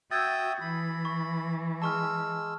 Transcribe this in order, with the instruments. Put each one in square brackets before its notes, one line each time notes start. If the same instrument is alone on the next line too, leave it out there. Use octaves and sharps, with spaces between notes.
[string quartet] F#4 [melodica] E5 G5 D#6 [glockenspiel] E6 G#6 A6
[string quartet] E3 [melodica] B5
[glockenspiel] C#6
[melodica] G#3 E6 [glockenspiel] A5 C#6 F6